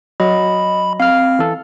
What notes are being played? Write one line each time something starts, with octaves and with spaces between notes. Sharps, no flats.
F#3 D#5 B5
C4 F5 F6
E3 A4